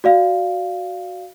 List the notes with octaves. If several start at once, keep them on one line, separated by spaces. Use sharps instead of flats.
F#4 D5 F5